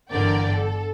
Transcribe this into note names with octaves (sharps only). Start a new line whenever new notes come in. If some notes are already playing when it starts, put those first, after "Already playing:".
G1 D3 E3 A#4 D5 G5
A4